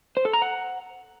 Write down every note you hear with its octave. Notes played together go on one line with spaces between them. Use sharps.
C5
A4
A#5
F#5